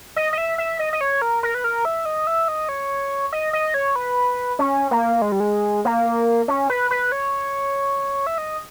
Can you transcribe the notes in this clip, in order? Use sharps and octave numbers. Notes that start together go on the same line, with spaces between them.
D#5
D#5
E5
E5
D#5
D#5
C#5
A#4
A#4
B4
A#4
E5
D#5
E5
D#5
C#5
D#5
D#5
C#5
B4
C#4
A#3
G#3
G3
G#3
A#3
C#4
B4
B4
C#5
E5
D#5